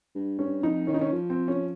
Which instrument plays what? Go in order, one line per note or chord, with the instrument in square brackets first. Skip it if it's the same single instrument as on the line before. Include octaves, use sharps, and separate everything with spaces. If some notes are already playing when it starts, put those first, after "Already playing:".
[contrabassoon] G2
[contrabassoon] G2 [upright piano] C#4
[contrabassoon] F2 [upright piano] D#4
[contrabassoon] D#3 [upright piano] C#4
[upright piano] D#4
C#4
[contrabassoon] F3
[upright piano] C4
C#4